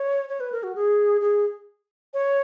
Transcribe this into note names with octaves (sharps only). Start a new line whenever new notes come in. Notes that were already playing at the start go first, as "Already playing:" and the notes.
Already playing: C#5
C#5
B4
A#4
F#4
G#4
G#4
C#5